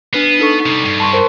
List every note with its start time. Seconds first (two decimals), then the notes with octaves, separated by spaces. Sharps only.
0.13 B3 D4 B4 C7
0.40 D#4 A4 C#6
0.66 C3 G3
0.85 G2
1.00 A5 C6 C#6
1.13 A#4 C5 C6